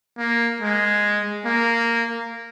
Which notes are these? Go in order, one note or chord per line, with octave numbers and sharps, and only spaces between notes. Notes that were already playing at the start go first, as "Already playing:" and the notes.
A#3
G#3
A#3